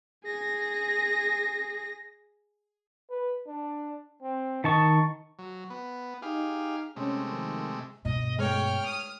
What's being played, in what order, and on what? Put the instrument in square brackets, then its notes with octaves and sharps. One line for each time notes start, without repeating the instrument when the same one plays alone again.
[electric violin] G#4 A#6
[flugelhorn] B4
D4
C4
[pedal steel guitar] D#3 A5 C#6 [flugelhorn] D#5
[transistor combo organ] F#3
B3
[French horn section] D#4 [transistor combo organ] G4 G#4 F5
[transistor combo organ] C3 G#3 A3 [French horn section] C#4
[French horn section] D#3 F3
[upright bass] G2 B2 [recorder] D#5
[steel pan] G#3 A3 [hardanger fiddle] C#5 G5 [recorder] F6
[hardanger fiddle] D#6